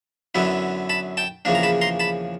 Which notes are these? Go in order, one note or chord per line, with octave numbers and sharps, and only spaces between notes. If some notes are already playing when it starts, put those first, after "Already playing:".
F#2 D3 F#3 B3 E4
A5 B5
G5 A5
E2 C#3 F3 A#3 D4
A#5
A5 B5
A#5 C6
A5 B5